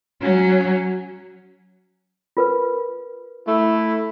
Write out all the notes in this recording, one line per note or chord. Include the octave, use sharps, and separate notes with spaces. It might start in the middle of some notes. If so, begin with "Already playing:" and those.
F#3 C#4
F4 A#4 B4
A3 E4